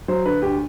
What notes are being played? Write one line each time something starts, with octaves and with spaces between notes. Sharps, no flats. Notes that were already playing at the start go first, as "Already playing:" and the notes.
F#3 C5
D3 B4
D2 G4